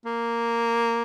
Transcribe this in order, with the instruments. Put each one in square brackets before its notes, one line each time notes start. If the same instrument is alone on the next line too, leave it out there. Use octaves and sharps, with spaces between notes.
[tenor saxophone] A#3